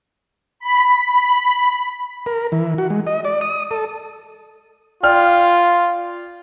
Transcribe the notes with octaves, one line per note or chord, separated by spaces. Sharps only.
B5
A#4
E3
F#4
G#3
D#5
D5
D#6
A4
F4 D5 G5 F6